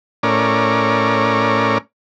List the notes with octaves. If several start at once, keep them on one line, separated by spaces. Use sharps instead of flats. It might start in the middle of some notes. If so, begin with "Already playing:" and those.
A2 C#4 A#4 D5